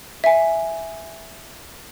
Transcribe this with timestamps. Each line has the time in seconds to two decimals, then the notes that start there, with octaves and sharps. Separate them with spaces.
0.24 E5 G#5